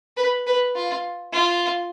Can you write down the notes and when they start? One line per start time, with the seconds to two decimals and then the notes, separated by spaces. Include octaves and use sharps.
0.17 B4
0.47 B4
0.76 F4
1.33 F4